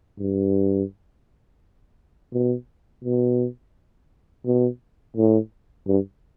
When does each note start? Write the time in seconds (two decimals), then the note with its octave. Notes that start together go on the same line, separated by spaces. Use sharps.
0.19 G2
2.33 B2
3.04 B2
4.46 B2
5.16 A2
5.88 G2